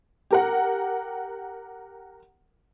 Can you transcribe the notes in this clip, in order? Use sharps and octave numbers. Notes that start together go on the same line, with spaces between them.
G4 A#4 F#5